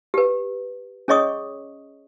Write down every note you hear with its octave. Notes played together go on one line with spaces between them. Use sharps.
G4 B4
C#4 G#4 C#5 D#5 C#6 D#6